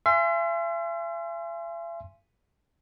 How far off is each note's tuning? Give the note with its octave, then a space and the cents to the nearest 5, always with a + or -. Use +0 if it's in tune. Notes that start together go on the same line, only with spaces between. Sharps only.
E5 +45 G#5 +0 C6 +0